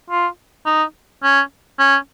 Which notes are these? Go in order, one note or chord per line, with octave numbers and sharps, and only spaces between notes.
F4
D#4
C#4
C#4